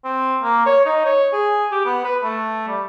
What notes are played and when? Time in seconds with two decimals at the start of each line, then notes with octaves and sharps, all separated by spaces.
0.04 C4
0.43 A#3
0.66 C#5
0.85 D#4
1.06 C#5
1.33 G#4
1.72 G4
1.85 B3
2.05 B4
2.23 A3
2.68 G3